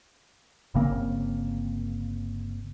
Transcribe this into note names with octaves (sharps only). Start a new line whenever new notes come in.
G1 C#3 A#3 C4